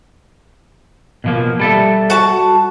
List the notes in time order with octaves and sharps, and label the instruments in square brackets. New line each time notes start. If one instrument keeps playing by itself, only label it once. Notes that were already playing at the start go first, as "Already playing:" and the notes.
[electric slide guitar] B2 F3 A#3
G3 A4 E5
[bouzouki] F#4 A5